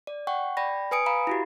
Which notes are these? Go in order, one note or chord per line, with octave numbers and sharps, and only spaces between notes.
D5
F#5 G5 C#6
D5 G5 B5 A#6
B4 G#5 D#6 C#7 D7
F5 A#5 B5
E4 F#4 G4